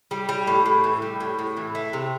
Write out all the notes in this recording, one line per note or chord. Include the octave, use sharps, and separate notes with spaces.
G3
G3
A2
A2
E3
G3
A2
A2
E3
A3
C3